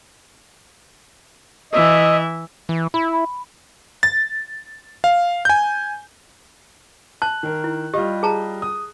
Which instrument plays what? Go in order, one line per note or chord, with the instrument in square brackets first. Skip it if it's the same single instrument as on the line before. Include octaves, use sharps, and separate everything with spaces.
[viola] E3 E5 [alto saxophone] D#5
[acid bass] E3
[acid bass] E4 [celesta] B5
[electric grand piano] A6
F5
G#5 G6
[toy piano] A5 [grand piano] F#6
[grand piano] D#3 A#4
[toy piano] E4
[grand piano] G3 F4 D#5 [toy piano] G4
[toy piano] G#4 A5 A#5
[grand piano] D#6